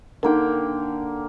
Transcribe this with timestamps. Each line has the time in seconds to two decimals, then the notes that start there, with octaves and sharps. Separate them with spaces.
0.23 D3 A#3 D#4 A#4 G5